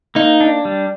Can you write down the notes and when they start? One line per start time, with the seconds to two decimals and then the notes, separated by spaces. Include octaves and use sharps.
0.15 A#3 D#4
0.41 D4
0.65 G3